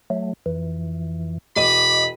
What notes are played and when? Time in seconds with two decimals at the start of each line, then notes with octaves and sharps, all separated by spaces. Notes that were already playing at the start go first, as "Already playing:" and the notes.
0.10 F#3 A3
0.46 F2 E3
1.56 E1 D#5 B5 D6 D#7